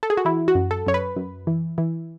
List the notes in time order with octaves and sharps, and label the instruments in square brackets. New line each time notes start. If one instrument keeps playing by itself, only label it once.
[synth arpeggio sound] A4
G#4
F#4
E3 E4
F#4
F#2
A4
F#2 C#5
B4
F#2
E3
E3